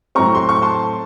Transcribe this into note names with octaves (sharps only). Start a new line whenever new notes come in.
A2 F#3 C4 A#5 C#6
C6
C#6
A5 C6